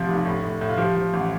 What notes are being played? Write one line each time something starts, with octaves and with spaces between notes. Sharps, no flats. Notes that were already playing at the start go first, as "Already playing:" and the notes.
Already playing: A1 C3 F3
F1
A2
A2
A2
F4
F3 G4
F3
A1